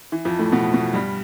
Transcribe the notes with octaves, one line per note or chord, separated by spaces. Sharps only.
E3
F2 F3
A2 A3
B2 B3
B2 B3
G2 G3